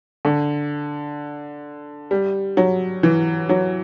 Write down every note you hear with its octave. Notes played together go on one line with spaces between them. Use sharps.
D3
G3
F#3
E3
F#3